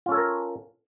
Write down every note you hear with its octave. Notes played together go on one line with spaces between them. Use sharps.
C#4 F4 A4 A#4 C#5